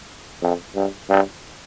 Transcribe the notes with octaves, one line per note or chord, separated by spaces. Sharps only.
F2
G2
G2